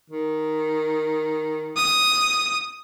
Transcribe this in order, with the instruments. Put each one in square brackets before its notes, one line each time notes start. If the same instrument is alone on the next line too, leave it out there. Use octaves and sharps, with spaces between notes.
[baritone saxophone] D#3
[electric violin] D#6